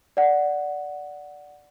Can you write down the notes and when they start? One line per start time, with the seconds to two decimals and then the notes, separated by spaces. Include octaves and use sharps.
0.17 D5 F#5